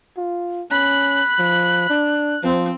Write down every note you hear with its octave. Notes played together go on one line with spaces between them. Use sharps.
F4
C#4 B5 F#6
F3
D4
F3 C4